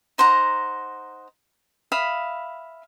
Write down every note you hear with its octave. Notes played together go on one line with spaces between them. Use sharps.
D#4 C5 F#5 A#5
E5 F5 B5 D#6